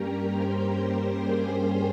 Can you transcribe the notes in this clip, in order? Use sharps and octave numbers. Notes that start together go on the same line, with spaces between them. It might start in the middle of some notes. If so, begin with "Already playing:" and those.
Already playing: G2 G3 A#3 C#4 G4 A#4 G5 A#5
C5 C6
A#4 A#5
G#4 G#5
A#4 A#5